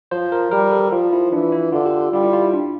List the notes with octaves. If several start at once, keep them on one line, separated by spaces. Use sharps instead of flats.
F3 C5
A#4
G3 A#4
A4
F3 F4
E4
E3 D4
E4
D3 F4
G4
G3 F4
E4
F4
E4
D4